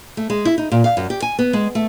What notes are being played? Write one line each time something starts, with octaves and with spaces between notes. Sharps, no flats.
A3
G#3
E4
D#4
A#2
F5
F#2
G4
G#5
B3
G#3
A3